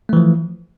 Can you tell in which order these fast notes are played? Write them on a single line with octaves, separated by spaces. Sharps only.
A3 E3 F3